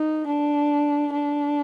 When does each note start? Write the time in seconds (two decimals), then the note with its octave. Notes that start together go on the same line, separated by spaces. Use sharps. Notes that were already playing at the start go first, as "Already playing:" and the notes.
Already playing: D#4
0.27 D4
1.12 D4